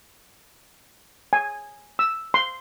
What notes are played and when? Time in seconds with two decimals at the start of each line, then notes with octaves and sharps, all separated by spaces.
1.33 G#5
1.99 E6
2.34 C6